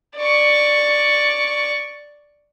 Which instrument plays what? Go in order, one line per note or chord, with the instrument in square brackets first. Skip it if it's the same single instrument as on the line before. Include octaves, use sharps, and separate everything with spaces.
[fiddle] D5 C#6